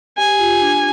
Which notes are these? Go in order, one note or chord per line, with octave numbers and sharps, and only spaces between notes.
G4 G#5
F4
D4